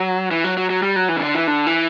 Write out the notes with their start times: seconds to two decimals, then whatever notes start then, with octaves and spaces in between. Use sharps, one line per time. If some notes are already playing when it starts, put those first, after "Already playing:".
Already playing: F#3
0.31 E3
0.44 F#3
0.57 F#3
0.70 F#3
0.83 G3
0.96 F#3
1.09 E3
1.16 C#3
1.22 D3
1.35 E3
1.47 D3
1.67 E3